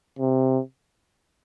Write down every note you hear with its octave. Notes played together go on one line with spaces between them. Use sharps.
C3